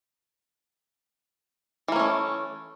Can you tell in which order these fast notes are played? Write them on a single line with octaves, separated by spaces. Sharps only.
E3 A#3 C#4 A3